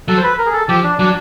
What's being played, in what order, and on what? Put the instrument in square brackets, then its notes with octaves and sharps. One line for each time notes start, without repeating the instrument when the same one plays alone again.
[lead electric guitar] F#3 [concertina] A4
[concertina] C5
B4
A#4
G#4
A4
[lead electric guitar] F3 [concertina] G4
[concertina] D4
[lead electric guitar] F#3 [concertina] D4